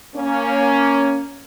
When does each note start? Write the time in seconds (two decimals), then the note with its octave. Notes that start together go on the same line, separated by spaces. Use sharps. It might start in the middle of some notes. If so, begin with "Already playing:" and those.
0.16 A#3 C#4